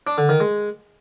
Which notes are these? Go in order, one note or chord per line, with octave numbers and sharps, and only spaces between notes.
D4
D3
D#3
G#3